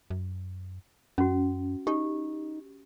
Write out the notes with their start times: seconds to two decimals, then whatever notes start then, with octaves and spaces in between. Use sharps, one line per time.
0.10 F#2
1.18 F#2 C#4 F#4
1.87 D#4 G4